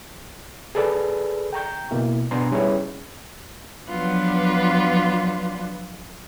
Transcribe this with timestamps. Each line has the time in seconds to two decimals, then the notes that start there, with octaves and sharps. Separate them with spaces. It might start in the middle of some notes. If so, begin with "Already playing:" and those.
0.75 G#4 A4 B4 D5
1.53 G5 A#5 C#6 G6
1.91 B2 A#3 E4
2.31 B2 B3 D4 G#5 A#5 C6
2.52 G3 C#4 E4 G#4 B4 C#5
3.88 F3 F#3 B3 D4 F4 B4